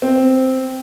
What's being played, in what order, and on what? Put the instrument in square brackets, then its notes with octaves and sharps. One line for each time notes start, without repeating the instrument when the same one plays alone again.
[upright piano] C4